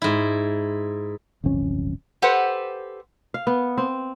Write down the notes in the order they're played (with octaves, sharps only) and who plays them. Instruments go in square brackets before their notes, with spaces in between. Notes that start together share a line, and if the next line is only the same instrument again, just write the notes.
[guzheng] G#2 E4
[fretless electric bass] D1 G1 F2 C#4
[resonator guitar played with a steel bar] G4 A4 B4 C5 F#5
[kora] F5
B3
C4